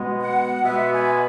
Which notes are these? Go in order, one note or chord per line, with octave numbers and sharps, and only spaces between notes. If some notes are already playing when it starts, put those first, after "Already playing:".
Already playing: B2 G#3 B3
F#5
B2 G#3 B3 E5
G#5